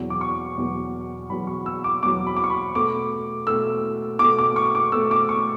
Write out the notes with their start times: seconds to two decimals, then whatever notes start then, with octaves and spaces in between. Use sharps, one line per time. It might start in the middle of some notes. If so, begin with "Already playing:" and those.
Already playing: E2 B2 F#3
0.10 D6
0.21 C#6
0.58 E2 B2 F#3
1.30 E2 B2 F#3 B5
1.47 C#6
1.66 E6
1.84 D6
2.03 E2 B2 F#3 D6
2.27 B5
2.36 D6
2.44 C#6
2.50 B5
2.75 B2 A3 D6
3.47 B2 A3 E6
4.19 B2 D6
4.24 A3
4.39 D6
4.56 C#6
4.75 D6
4.92 B2 A3 E6
5.11 D6
5.29 C#6